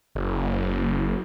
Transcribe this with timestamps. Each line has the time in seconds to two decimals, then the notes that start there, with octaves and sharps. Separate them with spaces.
0.15 F#1